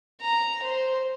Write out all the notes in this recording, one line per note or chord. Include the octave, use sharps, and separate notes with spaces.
A#5
C5